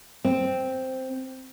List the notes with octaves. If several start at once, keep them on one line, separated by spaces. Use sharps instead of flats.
C4